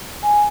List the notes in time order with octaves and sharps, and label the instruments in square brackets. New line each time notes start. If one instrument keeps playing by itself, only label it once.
[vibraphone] G#5